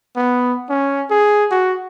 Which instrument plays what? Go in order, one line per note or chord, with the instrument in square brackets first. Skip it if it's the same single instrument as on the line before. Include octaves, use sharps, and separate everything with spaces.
[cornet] B3
C#4
G#4
F#4